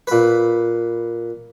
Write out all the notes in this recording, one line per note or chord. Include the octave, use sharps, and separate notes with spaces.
A#2 B4